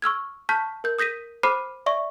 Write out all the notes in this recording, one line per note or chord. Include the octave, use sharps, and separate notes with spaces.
C#6 E6 F6 G#6
A5 C#6 F6 G6 B6
A#4 G6
D#6 G6 A#6 B6 D#7
C5 B5 D6 F6 C7 D#7
D5 E5 C#6